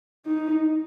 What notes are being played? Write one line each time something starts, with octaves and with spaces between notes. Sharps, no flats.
D#4